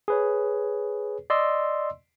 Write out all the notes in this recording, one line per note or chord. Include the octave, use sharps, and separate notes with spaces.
G#4 B4 C#5
D5 D#5 C6 E6